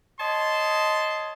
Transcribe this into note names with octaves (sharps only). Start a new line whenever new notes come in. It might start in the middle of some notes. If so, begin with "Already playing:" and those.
C#5 D#5 A5 C6